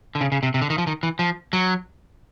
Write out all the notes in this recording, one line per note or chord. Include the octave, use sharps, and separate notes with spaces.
D3
C#3
C#3
C3
C3
D3
D#3
F3
D#3
E3
F3
F#3